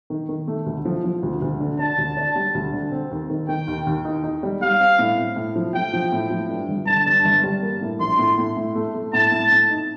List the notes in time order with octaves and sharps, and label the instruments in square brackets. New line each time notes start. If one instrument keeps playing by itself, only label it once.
[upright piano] D#3
D#3
A3
D2
F3
F3
D2
D2
D3
[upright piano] D4 [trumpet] A5
[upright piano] D2
D4
G3
D2
D3
C4
D#2
D#3
[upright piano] D#3 [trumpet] G5
[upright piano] D#2
D#2
D#4
D#4
G3
[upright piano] G3 [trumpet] F5
[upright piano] C4
A2
A2
A2
F3
[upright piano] F3 [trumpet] G5
[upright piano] F3
A2
F3
G2
G1
[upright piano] D3 [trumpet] A5
[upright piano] G2
G1
G3
A#3
A2
[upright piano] A#1 [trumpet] C6
[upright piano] A2
A2
A2
A3
A3
[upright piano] A2 [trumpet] A5
[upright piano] A2
A2
D#4